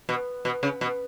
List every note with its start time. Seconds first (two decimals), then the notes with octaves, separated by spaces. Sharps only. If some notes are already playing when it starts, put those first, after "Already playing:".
0.09 B2
0.45 B2
0.63 C#3
0.81 B2